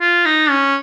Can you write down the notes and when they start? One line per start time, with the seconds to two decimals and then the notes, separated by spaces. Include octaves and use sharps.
0.01 F4
0.25 D#4
0.50 C#4